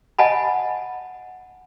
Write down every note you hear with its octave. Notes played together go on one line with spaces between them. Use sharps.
D#5 F#5 G#5 A5 B5